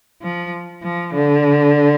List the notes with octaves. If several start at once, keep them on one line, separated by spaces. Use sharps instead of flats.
F3
F3
D3